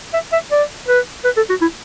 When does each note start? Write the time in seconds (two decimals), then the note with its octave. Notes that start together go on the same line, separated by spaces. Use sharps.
0.14 E5
0.32 E5
0.52 D5
0.88 B4
1.24 B4
1.37 A4
1.50 F#4
1.61 E4